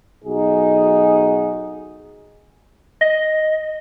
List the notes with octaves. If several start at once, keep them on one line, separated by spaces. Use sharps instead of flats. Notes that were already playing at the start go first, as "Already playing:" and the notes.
B1 D#4 F#4 G#4
D#5